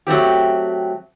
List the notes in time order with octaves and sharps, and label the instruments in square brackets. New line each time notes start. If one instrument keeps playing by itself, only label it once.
[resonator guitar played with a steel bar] F#3 A3 C4 G4